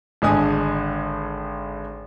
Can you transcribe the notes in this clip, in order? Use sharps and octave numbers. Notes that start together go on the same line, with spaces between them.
G#1 D3 G#3 G#5 D#6